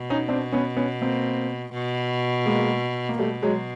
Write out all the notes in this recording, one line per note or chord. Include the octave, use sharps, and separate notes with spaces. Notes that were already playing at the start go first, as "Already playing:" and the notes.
Already playing: B2
C#4 D#4
C4 D4
B3 C#4
B3 C#4
A#3 C4
B2
G#3 A#3
A#3
B2 G3 A3
F#3 G#3